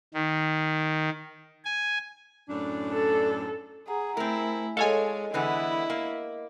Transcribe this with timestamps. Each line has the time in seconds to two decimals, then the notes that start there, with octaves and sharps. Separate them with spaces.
0.14 D#3
1.65 G#5
2.49 F#2 A2 D4
2.93 A4
3.88 G#4 F#5 A#5
4.17 A3 C4 E4 A#4 G#5
4.77 G#3 A4 C#5 D#5 F5 G#5
5.34 D3 E3 B3 E4
5.90 A#3